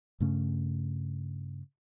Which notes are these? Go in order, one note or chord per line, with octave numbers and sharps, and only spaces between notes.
G2 C#3 A3 C#4